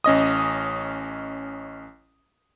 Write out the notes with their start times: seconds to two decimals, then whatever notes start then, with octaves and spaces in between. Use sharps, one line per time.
0.04 A1 C#4 D#5 D#6